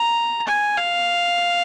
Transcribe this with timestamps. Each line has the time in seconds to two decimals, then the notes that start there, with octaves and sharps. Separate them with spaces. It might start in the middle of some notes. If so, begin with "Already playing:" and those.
Already playing: A#5
0.47 G#5
0.77 F5